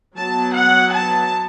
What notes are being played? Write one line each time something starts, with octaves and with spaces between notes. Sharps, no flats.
F#3 B3 A5
F#5
A5